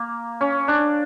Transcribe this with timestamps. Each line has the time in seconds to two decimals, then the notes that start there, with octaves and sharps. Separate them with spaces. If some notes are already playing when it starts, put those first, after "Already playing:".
Already playing: A#3
0.41 C#4
0.68 D4